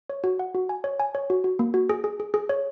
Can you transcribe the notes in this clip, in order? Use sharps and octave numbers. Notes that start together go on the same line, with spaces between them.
C#5
F#4
F#5
F#4
G#5
C#5
G#5
C#5
F#4
F#4
A#3
F#4
G#4
G#4
G#4
G#4
C#5